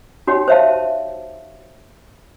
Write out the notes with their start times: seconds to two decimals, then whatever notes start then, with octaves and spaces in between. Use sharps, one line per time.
0.27 D#4 F#4 G4 C#5 G5
0.48 C5 C#5 E5 F5 A5